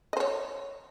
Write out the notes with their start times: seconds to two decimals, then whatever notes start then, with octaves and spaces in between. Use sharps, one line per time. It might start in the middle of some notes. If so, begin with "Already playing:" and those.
0.13 D#5
0.17 C5
0.20 C#5